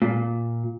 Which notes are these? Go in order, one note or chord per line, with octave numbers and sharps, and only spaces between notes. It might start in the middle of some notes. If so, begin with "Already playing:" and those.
A#2